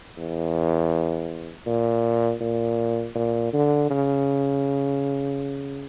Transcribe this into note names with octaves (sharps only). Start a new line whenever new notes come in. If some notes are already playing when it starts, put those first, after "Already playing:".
E2
A#2
A#2
A#2
D3
C#3